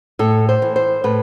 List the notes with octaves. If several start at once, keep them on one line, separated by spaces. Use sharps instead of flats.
A2 A4
C5
E3
C5
A2 B4